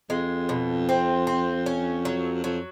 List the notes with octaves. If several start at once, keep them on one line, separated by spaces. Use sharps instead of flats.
F2 G#3
B2
C4
C4
C#4
F#3
F2 F#3